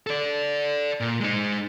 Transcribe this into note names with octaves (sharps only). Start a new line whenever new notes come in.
A4 D5
A#2
G#3 D#4